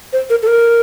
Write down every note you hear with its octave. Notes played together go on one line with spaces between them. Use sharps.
C5
A#4
A4
A#4